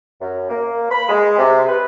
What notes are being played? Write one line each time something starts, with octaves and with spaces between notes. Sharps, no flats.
F#2
A#3
B5
G#3
C3
B4